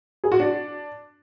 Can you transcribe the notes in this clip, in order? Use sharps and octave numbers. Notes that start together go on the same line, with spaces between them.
G#4
F#4
D4